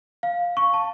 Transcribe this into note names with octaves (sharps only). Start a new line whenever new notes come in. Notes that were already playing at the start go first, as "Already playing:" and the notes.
F5
C#6
A5